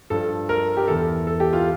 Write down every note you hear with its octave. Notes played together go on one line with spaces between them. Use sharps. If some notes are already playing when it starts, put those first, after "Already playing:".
G2 F3 A4
A#4
G4
E2 E3 A4
A4
G4
F4